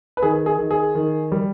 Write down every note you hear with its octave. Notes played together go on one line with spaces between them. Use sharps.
B4
D#3 G#4
G#4
D#3
G#4
D#3
G3